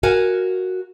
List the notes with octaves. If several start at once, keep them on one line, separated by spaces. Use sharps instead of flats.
F#4 A#4 F5 F#5 G#5